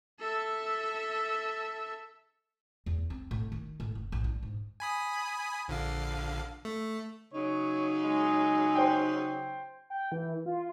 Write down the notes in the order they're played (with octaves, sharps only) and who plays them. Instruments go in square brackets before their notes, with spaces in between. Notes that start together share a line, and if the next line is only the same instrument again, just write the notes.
[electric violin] A4 E5
[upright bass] E2
C4
A2
D#3
A2
F#1
A1
D4
G#2
[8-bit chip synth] G#5 B5 D#6
A#1 D3 F5
A3
[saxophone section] C#3 F#3 D#4 [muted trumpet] C#5
[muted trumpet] G#3
[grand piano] C5 G5
[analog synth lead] G5
E3
F4